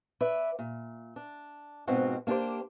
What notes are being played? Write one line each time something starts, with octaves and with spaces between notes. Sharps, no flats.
B4 D5 E5
A#2
D4
G#2 B2 C4 F4 F#4
A#3 D4 F#4 G4 C5